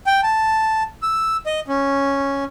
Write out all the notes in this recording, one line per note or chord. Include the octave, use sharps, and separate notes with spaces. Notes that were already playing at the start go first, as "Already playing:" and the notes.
G5
A5
E6
D#5
C#4